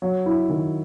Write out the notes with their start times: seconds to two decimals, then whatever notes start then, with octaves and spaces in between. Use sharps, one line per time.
0.02 F#3
0.26 E4
0.49 D#3